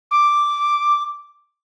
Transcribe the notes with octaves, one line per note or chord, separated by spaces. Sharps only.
D6